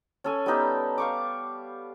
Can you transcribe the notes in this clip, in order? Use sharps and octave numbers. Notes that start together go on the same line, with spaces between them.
C#4 A4 G#5
G3 B3 D#4 G4
F5 C#6 D6